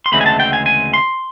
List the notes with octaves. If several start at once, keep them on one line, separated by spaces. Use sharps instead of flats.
C6
D2 C#3 E3 G#3 C4 B5
G#5
A5
G5
G#5
G#5
C6